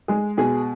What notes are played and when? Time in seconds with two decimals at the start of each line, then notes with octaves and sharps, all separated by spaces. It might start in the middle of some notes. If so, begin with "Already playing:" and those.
0.08 G#3 G#4
0.38 B2 G#4